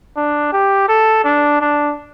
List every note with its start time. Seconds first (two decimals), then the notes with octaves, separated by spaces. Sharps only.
0.17 D4
0.53 G4
0.89 A4
1.24 D4
1.61 D4